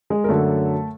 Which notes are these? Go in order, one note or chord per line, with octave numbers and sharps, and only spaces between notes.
G#3 G#4
A#4
F#2 D3 F#3 A3 A4